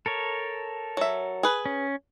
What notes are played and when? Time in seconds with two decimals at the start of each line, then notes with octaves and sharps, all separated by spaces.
0.06 A4 A#4 C#5
0.97 F#3 E5
1.43 G#4 B4
1.66 C#4